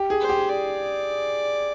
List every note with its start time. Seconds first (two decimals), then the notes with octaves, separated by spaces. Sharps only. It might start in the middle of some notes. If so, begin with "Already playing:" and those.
Already playing: G4
0.10 G#4
0.20 C5
0.29 G4
0.49 D5